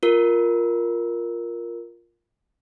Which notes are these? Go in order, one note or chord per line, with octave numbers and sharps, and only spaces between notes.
F4 A#4